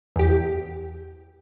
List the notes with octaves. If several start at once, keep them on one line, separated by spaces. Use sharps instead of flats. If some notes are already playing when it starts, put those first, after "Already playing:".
E2 G4